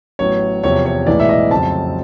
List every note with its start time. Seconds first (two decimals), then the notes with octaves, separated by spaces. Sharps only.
0.19 A1 A2 F#3 B3 C#5
0.63 E2 C3 F3 C#5
0.86 C#5
1.06 B1 A2 E3 G#3 B3 D5
1.20 E5
1.29 D#5
1.50 F2 C#3 F#3 A3 C4 A5